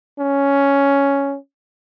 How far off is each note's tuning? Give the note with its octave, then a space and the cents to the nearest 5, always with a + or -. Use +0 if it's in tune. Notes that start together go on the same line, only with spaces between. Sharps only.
C#4 +5